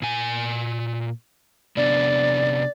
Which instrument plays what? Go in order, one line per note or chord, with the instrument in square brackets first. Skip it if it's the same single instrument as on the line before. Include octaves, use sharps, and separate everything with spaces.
[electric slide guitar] A#2 G#5
[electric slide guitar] C3 B3 D4 [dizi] D5